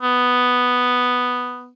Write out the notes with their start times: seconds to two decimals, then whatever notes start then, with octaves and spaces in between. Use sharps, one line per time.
0.03 B3